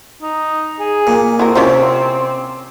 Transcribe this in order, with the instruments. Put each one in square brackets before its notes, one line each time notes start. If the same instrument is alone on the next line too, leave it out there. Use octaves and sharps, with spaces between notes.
[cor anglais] D#4
G#4
[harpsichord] A#2
[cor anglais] C4 [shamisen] E4 F#4 A#4
[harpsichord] C3 [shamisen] C#4 F4 C5